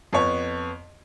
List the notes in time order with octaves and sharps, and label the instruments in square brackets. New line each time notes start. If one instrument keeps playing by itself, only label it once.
[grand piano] F2 B3 C#5